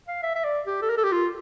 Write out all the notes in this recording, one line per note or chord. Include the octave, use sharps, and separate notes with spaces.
F5
E5
E5
D5
G4
A4
A#4
A4
G4
F4